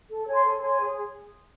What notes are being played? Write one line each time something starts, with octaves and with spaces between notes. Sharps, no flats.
A4
C#5 G#5 C6
A4
C#5 G#5 C6
G#4